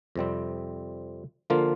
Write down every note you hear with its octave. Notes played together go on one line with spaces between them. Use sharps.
F2 C3 G3 C4
D3 F3 A#3 F4